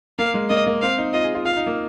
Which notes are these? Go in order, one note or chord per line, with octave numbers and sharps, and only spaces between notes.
A#3 F5
G#3
A#3 D#5
A#3
C4 F5
D#4
F4 D#5
G#4
F4
F4 F5
D#4
A#3